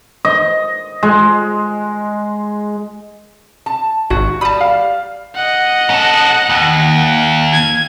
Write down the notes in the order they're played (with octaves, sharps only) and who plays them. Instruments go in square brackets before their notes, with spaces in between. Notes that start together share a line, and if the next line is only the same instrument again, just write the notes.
[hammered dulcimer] D#5
G#3
[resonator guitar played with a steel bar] A5
[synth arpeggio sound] G#1 [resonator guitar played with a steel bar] F#4
[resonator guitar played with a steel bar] G3 [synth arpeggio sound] A5 D#6 [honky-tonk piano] B5
[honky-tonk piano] F5
[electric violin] D#5 F#5
[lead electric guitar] C#4 A4
D#2
[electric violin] G#6